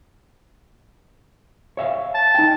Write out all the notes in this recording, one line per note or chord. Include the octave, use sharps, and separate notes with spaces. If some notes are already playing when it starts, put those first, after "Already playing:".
C#5 E5 F5
A5
D#4 G5